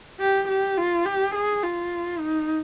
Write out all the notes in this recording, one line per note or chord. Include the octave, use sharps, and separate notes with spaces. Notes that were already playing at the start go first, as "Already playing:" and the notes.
G4
G4
F4
G4
G#4
F4
D#4